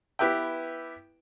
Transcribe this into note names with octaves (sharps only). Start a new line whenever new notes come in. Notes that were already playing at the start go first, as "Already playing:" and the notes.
B3 E4 G4 B4 E5 G5